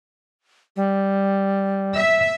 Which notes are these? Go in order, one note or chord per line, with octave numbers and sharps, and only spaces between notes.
G3
E5